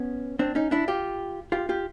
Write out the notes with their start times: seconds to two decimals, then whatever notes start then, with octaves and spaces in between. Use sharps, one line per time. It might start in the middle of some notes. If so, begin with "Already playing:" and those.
Already playing: B3 C#4
0.39 C4 D4
0.55 C#4 D#4
0.71 D4 E4
0.88 F4 G4
1.52 F4 G4
1.69 F4 G4